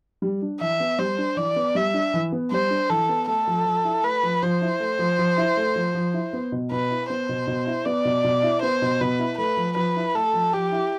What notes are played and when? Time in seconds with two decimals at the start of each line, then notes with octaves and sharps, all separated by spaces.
0.22 G3
0.42 D4
0.61 E3 E5
0.80 B3
0.99 G3 C5
1.18 D4
1.37 E3 D5
1.56 B3
1.75 G3 E5
1.94 D4
2.14 E3
2.32 B3
2.51 G3 C5
2.70 D4
2.90 E3 A4
3.09 B3
3.27 A3 A4
3.47 F3
3.66 F3
3.85 E4
4.04 A3 B4
4.23 F3
4.42 F3 C5
4.61 E4
4.80 A3
4.99 F3
5.19 F3
5.37 E4
5.57 A3
5.76 F3
5.95 F3
6.14 E4
6.33 B3
6.52 B2
6.71 B2 B4
6.91 E4
7.10 B3 C5
7.29 B2
7.47 B2
7.67 E4
7.85 B3 D5
8.05 B2
8.24 B2
8.43 E4
8.62 B3 C5
8.82 B2
9.01 B2 B4
9.19 E4
9.38 A3 B4
9.57 F3
9.76 F3 B4
9.96 E4
10.15 A3 A4
10.34 F3
10.53 F3 G4
10.72 E4